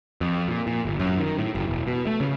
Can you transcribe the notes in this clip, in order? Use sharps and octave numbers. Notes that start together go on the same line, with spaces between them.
F2
A#2
A#2
G1
F#2
D#3
A2
F#1
E1
B2
A3
C#3